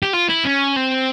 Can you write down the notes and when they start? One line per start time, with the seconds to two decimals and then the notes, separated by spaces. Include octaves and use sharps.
0.03 G4
0.13 F4
0.29 E4
0.45 C#4
0.76 C4